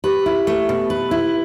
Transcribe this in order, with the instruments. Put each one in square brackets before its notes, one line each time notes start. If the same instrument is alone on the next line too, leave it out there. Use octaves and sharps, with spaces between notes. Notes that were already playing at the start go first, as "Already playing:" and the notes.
[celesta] G4 [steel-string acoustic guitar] B4
[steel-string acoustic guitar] E4
A3
B2
B4
E4